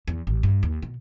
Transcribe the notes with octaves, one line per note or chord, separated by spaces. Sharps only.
E2
A1
G2
D#2
B2